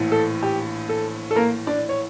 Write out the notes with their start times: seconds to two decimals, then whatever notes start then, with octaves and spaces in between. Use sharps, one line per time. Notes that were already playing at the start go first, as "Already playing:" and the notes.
Already playing: A#1 A2 E3
0.12 A4
0.43 G4
0.89 A4
1.31 A4
1.36 A#3 A#4
1.67 D4 D5
1.89 C#5